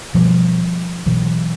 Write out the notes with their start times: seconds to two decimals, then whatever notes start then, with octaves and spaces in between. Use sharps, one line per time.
0.14 B2 F3 G3
1.06 B2 E3 F#3